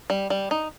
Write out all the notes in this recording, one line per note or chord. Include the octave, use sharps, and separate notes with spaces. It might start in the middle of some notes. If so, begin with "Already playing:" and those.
G3
G3
D#4